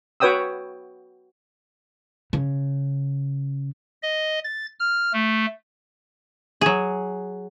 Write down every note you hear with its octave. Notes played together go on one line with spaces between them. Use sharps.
F#4 B4 C#5 G5 D#6 E6
C#3
D#5
A6
F6
A3
F#3 G#4